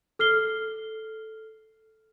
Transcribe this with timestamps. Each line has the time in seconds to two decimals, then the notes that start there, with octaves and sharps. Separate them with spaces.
0.19 A4 F6 C7 G7